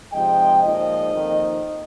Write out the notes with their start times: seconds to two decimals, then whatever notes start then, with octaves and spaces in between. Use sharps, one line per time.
0.12 C3 F3 G#3 D#4 D#5 G5
0.63 A#2 F3 G#3 D#4 C5 D#5
1.14 F2 D#3 A#3 D#4